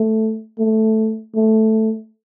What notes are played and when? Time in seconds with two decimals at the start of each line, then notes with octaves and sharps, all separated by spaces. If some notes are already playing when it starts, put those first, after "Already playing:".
Already playing: A3
0.59 A3
1.36 A3